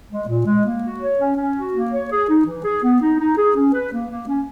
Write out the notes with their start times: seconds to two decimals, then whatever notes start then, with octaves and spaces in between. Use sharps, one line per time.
0.10 G#3
0.28 A#2
0.46 G#3
0.65 A#3
0.83 F#4
1.00 C#5
1.19 C#4
1.37 C#4
1.56 F#4
1.73 A#3
1.91 C#5
2.10 G#4
2.29 D#4
2.46 E3
2.64 G#4
2.83 B3
3.01 D#4
3.19 D#4
3.37 G#4
3.56 C#4
3.73 B4
3.92 A#3
4.10 A#3
4.28 C#4